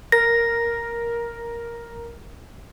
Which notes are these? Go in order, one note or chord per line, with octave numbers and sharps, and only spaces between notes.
A#4 A#6